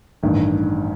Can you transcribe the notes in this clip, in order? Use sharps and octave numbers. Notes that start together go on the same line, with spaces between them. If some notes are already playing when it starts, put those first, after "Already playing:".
A1 G2 D#3